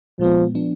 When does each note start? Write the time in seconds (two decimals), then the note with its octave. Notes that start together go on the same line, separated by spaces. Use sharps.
0.19 A#2 F3 G#3 B3
0.55 F3 B3 D4